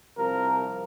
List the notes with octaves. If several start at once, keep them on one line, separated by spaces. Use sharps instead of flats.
C2 C3 F3 A#4